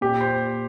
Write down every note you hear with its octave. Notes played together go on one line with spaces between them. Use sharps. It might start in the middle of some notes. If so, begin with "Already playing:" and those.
A#2 G4
C5